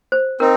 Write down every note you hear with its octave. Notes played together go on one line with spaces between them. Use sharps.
C5
C4 D#4 A#4